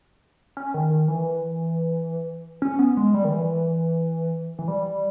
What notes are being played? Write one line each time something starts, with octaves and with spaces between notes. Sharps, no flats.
C#4
D#3
D#3
E3
C#4
B3
G#3
G3
D#3
E3
E3
G3